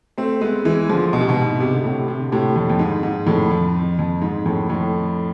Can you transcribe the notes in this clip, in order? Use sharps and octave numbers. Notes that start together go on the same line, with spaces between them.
A3 C4
G#3 B3
E3 G#3
D3 F3
B2
C3
G#2 B2
C3
D3
A2 C3
C3
D3
A2 C3
F2 A2
F2
G#2
G#2
F2 A2
F2
F2
G#2
F2 A2
F2 A2